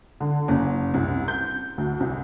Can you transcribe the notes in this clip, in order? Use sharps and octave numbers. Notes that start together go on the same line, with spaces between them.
D3
F#1
C2
G6
D2
C2